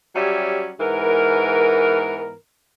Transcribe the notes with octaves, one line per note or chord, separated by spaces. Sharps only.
F#3 G3 C#4 G4 E5
G#2 E3 B3 A#4